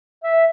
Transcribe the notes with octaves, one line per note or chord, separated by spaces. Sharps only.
E5